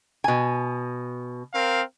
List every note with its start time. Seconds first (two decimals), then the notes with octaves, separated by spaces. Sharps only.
0.24 B2 G#5
1.53 C4 A#4 F5